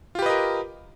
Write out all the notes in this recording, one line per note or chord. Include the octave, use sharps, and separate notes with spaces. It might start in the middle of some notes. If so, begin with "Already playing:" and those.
F4 G4 A#4 B4 D#5